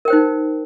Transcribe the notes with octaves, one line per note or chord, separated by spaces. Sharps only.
D#4 A#4 C5 G5